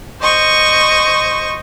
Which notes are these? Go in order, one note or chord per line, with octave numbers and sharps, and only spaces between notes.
C5 D#5 C#6